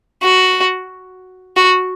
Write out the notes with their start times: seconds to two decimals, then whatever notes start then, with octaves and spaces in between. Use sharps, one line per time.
0.23 F#4
1.57 F#4